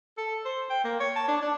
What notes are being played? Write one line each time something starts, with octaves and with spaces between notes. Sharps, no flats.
A4
C5
G5
A#3
C#5
A5
D4
D4